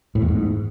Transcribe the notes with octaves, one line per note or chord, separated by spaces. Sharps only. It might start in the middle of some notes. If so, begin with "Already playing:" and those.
A2
E2
G#2